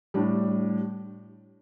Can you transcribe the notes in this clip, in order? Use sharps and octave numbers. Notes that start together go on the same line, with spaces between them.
A2 G3 D4